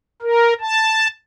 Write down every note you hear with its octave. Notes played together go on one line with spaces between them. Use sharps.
A#4
A5